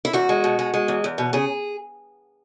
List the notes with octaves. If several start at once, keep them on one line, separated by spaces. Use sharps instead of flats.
E4
E2 F#4
G#3
B2
G#3
G#3
E2
E2
B2
C#3 G#4